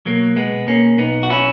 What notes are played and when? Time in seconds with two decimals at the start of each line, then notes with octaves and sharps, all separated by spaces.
0.05 B2 F#3 A#3
0.36 G#3 B3
0.53 B2
0.68 A#3 C#4
0.98 B1 B3 D#4
1.23 F#4
1.30 C#4 E4